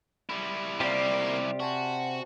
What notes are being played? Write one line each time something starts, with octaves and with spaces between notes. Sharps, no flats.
G3 E4
C3 A#3 F4 G4 D5 D#5
F#4 C5 G#5 A5